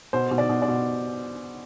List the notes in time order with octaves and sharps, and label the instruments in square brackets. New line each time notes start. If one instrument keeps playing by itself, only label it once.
[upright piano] B2 C5
B2
D5
B2
D5
B2